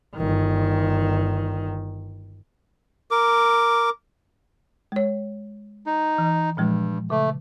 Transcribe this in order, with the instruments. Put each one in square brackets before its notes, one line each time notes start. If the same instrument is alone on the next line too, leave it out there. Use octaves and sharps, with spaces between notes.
[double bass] G1 D#3
[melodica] A#4 D6
[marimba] G#3 C#5
[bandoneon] D#4
[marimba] E3
[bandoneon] G2 [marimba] A#2 F3 G#3
[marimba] C#3 [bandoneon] A3